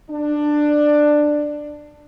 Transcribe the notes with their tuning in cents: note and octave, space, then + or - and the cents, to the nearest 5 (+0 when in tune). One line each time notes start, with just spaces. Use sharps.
D4 +15